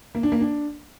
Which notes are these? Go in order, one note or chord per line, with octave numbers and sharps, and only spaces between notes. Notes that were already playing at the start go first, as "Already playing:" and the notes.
A#3
D4
A#3
D4